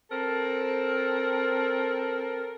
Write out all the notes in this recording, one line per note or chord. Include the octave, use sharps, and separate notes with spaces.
C4 A4 A#4